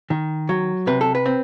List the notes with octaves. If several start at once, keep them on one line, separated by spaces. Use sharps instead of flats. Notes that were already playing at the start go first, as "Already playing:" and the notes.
D#3
F#3
C3 B4
A4
B4
C4